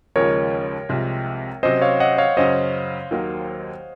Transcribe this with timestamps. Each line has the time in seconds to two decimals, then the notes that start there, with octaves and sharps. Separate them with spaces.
0.16 D#2 C#3 F3 G#3 A#4 C#5
0.89 C2 C3 F3 G#3 C4
1.63 C3 F#3 C#4 C5 D#5
1.82 C#5 F5
2.00 D#5 F#5
2.18 C#5 F5
2.37 F#2 C#3 F#3 C#4 C5 D#5
3.11 D#2 D#3 F#3 A#3